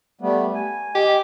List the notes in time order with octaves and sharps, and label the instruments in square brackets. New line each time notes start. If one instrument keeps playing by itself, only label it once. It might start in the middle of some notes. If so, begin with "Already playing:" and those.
[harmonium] G3 A3 B3
G#5
[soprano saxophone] G4 [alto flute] D#5